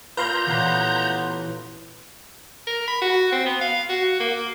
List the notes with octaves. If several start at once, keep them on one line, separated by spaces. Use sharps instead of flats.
A#2 B4 F5 A#5 C6 G6
A1 A#2 B3
A#4
B5
F#4
C4
B3
F5
F#4
A#3